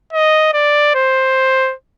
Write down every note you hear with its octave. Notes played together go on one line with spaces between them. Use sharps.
D#5
D5
C5